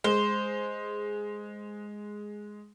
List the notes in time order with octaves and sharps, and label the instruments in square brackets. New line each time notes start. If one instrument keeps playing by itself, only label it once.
[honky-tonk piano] G#3 [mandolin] C5